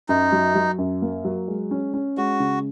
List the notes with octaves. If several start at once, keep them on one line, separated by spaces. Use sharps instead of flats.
F#2 D#4
F#3
F#3
F#2
A#3
F#3
G#3
C#4
C#4
G#3 F#4
C#3